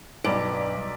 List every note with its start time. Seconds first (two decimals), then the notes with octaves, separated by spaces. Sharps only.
0.24 B1 G2 D5 D7